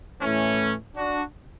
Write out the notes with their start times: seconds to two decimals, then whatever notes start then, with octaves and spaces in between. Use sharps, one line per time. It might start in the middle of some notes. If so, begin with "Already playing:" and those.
0.22 A2 E3 A3 C#4
0.96 D4 F#4